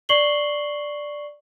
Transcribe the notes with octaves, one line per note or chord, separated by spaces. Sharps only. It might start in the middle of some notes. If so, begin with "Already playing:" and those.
D5 C#6 C7 F#7 G7